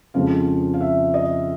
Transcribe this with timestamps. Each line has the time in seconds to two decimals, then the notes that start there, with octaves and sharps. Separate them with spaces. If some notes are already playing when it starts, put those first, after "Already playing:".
0.14 F2 C#3 F3 G#3 F5
0.74 F5
0.81 E5
1.14 D#5